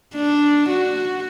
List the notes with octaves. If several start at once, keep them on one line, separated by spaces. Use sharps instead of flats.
D4
F#4